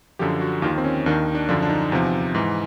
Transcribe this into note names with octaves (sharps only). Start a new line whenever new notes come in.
F#2 D3 F3 G4
F#4
D#2 D#3 F4
C4
C#4
D#2 D#3 D4
D4
F#2 D3 F3 D4
D4
D#4
E2 C3 F3
G#2 E3